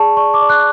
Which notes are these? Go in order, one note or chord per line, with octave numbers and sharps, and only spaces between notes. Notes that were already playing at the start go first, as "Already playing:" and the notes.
Already playing: G#4 D5 A5 C#6
D5 C#6
D6
D5
F#6